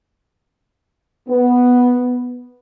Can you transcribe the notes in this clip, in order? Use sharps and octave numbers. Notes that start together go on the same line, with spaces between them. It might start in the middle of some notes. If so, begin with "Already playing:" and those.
B3